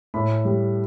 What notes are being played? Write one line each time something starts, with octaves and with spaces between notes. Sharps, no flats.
A2 B5
G3